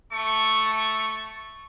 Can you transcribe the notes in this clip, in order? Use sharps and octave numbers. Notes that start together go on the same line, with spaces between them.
A3 A5 C#6